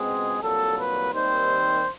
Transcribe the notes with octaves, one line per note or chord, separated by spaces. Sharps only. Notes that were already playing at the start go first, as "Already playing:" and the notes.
Already playing: C#2 B2 G#3 C4 G#4
C2 A#2 F#3 A4
B4
D#2 D#3 G3 C4 C5